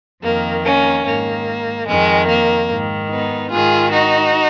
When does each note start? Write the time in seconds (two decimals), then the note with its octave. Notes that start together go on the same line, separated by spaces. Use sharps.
0.22 F2 D#3 A#3
0.63 A#3 C#4
1.05 G#2 D#3 A#3
1.87 F2 D#3 G#3
2.28 A#3
2.69 G#2 D#3
3.10 B3 D#4
3.51 G#2 D#3 F4 G#4
3.92 D#4 F#4